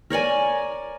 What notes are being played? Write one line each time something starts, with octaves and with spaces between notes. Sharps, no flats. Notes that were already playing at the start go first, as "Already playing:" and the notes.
A#4 C#5 D5 G#5